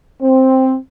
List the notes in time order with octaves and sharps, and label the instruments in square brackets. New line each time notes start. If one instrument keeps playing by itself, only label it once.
[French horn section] C4